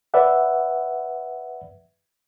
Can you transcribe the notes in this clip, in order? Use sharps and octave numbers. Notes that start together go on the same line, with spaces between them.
B4 D5 E5 F#5